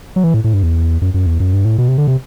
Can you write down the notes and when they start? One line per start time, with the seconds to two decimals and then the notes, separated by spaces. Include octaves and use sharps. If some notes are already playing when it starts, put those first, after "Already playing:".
0.16 F#3
0.24 E3
0.34 A2
0.44 A2
0.54 G2
0.63 E2
1.02 F#2
1.14 F#2
1.26 E2
1.40 F#2
1.53 G2
1.65 A2
1.78 B2
1.88 C3
1.98 D3
2.08 C3